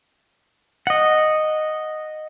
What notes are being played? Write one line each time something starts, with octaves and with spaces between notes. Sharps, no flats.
D#5 F#5